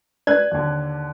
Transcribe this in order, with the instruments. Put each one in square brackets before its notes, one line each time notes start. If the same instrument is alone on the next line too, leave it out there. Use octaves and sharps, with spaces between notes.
[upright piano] B4 F#6 G#6 [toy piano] D5
[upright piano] D#2 D3